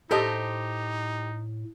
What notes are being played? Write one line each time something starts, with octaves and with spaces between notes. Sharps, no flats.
A2 D#4 G4 A4 C5 D#5 C6